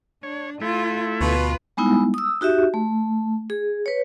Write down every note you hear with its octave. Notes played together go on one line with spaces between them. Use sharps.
D4 C#5
A3 E4 F4
D2 B2 F4 B4
G3 G#3 B3 D#4 E4
D#6 E6
D#4 F#4 G4 E5
A3
G#4
B4 C#5